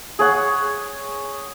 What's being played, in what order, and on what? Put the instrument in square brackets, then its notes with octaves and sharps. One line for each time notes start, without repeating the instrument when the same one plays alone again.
[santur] G#4 C#5 F#5